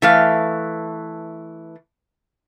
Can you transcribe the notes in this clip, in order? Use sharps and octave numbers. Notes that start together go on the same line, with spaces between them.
E3 A3 F5